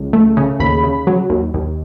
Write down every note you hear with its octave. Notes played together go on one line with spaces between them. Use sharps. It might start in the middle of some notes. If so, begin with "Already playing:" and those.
Already playing: C#2
A3
C#3
D#2 B5
C#3
F#3
D#2
D#2